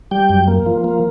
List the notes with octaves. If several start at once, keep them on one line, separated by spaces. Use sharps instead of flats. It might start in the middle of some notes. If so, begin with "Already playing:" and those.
G3 G5
F#2
A#3
F3
A#3